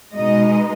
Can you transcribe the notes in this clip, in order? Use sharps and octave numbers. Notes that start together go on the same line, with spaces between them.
B2 G#3 D#4 D#5